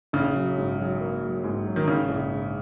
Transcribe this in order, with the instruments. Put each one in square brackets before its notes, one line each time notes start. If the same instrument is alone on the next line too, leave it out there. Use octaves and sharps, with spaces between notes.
[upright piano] A#1 [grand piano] C#3
[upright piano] F#3
G#2
F#3
A#3
F#3
G#2
F#3
[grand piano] D#3
[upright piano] G#2 [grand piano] C#3
[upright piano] A#1
G#2